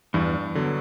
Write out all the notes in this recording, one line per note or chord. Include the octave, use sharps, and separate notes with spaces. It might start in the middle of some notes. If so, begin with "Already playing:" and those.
E2 G2
D3 F#3 B3